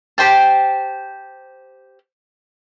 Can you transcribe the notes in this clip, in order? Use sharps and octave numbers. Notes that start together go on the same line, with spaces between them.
G4 C5 G5 A5